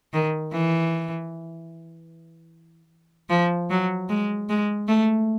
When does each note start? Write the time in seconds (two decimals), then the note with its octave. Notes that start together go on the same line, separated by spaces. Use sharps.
0.13 D#3
0.52 E3
3.29 F3
3.70 F#3
4.09 G#3
4.49 G#3
4.88 A3